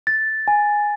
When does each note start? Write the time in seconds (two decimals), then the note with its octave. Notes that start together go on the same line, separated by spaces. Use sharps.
0.07 A6
0.48 G#5